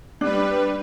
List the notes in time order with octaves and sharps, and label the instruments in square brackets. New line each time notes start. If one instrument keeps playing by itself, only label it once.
[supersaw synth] G3 B4 [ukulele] D4